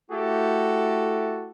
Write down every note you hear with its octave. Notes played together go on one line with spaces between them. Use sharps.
A3 E4 F#4 G4 A4